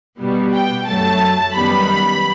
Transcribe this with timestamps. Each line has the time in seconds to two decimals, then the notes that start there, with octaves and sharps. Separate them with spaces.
0.20 B2 G3 B3
0.54 G5
0.87 F#2 F#3 A3 A5
1.55 F#2 D#3 G3 B3 B5